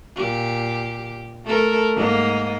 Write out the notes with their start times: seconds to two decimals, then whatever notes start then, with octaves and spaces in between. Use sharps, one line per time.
0.16 A#2 G4
1.46 A3 A4 A#4
1.95 G#2 A#3 D#5